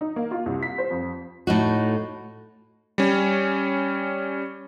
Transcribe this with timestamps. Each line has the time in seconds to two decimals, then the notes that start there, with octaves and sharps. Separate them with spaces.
0.01 D#4
0.16 A#3
0.31 F4
0.46 C2
0.63 B6
0.78 C5
0.90 F2
1.47 A2 D#4 F#4
2.98 G3 C#4